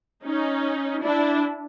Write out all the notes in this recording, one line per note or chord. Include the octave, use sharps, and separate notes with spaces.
C#4 D#4
D4 E4